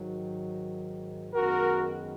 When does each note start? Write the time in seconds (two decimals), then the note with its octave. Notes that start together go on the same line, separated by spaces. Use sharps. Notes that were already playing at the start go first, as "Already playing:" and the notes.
Already playing: G#2 D#3 F#3
1.34 F#2 D#3 G#3 B3 F#4 A#4